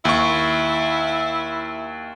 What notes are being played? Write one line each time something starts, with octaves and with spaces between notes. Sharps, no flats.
D#2 E4 C#6